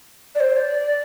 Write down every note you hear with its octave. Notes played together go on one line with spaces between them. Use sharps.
D5
C5
D5